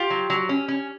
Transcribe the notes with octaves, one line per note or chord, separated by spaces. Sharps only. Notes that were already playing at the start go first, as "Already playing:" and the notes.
Already playing: F4 G4
F#3
F#3
C#4
C#4